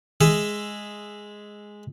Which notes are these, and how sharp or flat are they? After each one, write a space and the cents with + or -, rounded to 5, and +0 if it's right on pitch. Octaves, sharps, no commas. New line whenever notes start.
G#3 +0 G#4 +0 E5 +10